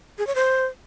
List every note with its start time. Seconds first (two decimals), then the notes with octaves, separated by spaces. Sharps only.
0.18 G#4
0.27 C#5
0.35 C5